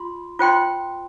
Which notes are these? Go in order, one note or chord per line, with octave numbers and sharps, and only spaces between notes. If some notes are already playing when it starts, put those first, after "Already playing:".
Already playing: F4 C6
F4 C5 G5 C6